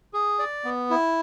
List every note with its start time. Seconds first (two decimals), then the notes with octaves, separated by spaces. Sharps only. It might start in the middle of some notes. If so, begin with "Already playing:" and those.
0.13 G#4
0.39 D5
0.65 B3
0.90 E4